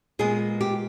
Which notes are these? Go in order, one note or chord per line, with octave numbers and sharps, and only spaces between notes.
A#2 G#3 B3 G#4
G4